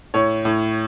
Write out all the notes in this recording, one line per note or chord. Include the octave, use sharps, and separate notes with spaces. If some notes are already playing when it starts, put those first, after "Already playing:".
A2 C#5
A2